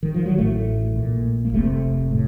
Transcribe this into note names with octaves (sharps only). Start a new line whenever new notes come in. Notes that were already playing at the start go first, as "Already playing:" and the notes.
D#3
F3
F#3
A1 A2 A3
A#1 A#2
A#3
F1 F2 C3 A3
A2